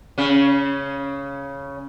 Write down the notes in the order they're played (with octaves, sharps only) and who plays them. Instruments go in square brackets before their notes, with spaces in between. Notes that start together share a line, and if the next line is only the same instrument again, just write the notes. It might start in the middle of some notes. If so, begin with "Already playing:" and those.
[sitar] C#3 C#4